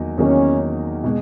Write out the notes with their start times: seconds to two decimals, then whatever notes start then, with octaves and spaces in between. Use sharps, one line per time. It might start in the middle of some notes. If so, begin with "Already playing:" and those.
Already playing: E2 D#3 F#3 A#3 D#4
0.18 E2 D#3 F#3 A#3 C#4 D#4
1.04 B2 G#3